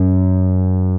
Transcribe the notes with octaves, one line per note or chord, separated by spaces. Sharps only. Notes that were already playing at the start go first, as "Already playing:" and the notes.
Already playing: F#2